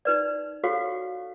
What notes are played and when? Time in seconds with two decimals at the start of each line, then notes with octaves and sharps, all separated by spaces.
0.05 D#4 B4 D5
0.64 F#4 G4 A4 C#5 F5